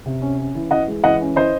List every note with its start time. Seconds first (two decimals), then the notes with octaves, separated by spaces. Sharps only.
0.06 C3
0.22 C#4
0.38 C#4
0.55 E3
0.71 E3 D#5 F#5
0.88 G#3
1.03 E3 D#5 F#5
1.21 C#4
1.36 E3 C5 D#5